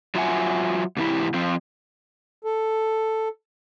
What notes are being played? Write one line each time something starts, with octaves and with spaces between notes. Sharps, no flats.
F#3 F4 E5 F#5 G#5
G#2 C3 E3 C4 E4 G4
F3 C4 F4
A4